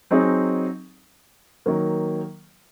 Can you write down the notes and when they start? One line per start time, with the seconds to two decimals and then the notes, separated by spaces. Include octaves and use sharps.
0.11 F#3 C4 D#4 G#4
1.66 D#3 F#3 A#3